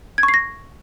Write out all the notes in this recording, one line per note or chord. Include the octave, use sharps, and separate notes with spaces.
G#6
C#6
C7
A#6